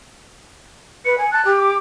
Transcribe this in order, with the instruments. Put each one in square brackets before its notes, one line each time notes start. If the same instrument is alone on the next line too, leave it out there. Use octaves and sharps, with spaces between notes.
[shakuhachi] B4 [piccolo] C#7
[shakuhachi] G#5
[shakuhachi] A5 [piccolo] F#6
[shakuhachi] G4
[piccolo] D6